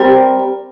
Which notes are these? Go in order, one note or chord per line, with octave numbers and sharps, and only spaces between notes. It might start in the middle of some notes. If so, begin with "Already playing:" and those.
Already playing: G3 C4 G4 A#4